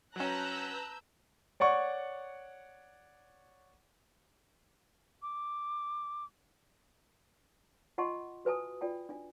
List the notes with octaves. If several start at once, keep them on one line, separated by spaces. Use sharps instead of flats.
F#3 C#4 B4 A5 A#5 E6 F#6 G6
C#5 D5 F#5 C#6
D6
F4 D#5 F#5 A5 C6 C#6
F#4 B4 G#5 A5 D#6
F4 D5 G5 A5
D4 G#5